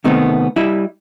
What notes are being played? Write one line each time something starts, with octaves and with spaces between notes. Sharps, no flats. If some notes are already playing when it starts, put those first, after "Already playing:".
C3 D#3 A3 B3 C4
G3 E4 D#5 E5